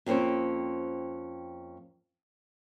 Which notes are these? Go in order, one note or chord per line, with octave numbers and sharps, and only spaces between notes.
F2 A#3 C4 C#4 C5